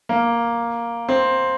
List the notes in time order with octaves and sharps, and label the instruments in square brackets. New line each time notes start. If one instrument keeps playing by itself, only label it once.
[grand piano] A#3
C4